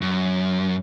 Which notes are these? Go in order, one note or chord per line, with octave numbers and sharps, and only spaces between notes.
F#2